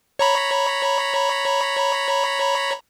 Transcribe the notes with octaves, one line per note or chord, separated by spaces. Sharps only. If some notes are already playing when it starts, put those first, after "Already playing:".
C#5 A#5 B5